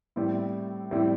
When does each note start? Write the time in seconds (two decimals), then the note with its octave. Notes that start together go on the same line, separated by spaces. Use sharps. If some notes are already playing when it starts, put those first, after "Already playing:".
0.16 A2 G3 C4 E4
0.91 A2 G3 C4 E4